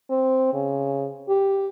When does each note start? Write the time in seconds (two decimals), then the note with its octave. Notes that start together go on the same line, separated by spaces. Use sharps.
0.10 C4
0.54 C#3
1.29 G4